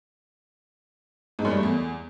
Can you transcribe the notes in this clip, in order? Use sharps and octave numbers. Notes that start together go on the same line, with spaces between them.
G#2
F#2
G3
A3
E2